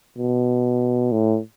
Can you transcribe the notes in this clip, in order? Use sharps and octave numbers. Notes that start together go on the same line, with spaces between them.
B2
A2